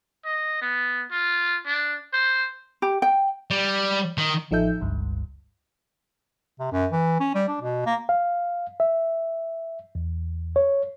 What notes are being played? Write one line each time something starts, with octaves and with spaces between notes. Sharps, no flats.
D#5
B3
F4
D4
C5
G4
G5
G3
D#3
A1 F3 D#4 A4 E5 G6
G1 C#2 G2
C3
F#2
E3
C#4
G3
D4
B2
A#3
F5
E5
E2
C#5